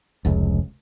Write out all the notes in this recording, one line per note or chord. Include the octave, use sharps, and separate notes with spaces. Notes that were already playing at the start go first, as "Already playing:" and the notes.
F1 C#2